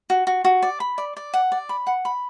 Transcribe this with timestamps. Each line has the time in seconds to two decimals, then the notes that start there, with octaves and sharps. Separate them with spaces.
0.10 F#4
0.27 F#4
0.44 F#4
0.62 D5
0.80 B5
0.98 D5
1.17 D5
1.34 F#5
1.52 D5
1.69 B5
1.87 F#5
2.05 B5